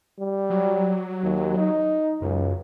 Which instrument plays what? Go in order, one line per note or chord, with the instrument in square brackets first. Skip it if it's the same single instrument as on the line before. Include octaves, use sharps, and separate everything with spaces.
[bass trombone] G3
[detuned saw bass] F#3
[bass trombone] D#2
D#4
[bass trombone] C#2 [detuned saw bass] F#2